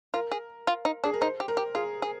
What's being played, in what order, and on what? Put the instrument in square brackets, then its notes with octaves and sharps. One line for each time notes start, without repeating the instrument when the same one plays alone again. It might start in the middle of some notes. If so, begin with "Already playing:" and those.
[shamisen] F4 [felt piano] A#4
[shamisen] G#4
F4
D#4
[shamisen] D4 [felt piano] G#4
[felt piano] A#4
[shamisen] D#4 [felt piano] C5
[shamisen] G4
[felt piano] A#4
[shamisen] G4
[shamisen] F4 [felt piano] G#4
[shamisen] G#4